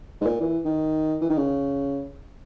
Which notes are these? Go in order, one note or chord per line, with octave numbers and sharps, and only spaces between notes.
G#2
A#2
E3
D#3
E3
D#3
C#3